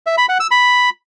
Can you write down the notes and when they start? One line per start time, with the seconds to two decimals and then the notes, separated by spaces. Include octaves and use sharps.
0.06 E5
0.18 B5
0.29 F#5
0.40 E6
0.51 B5